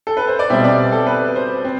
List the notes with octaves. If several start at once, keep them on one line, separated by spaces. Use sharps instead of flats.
A4
B4
C5
D5
B2 G3 C4 E5
D5
A4
B4
C5
C4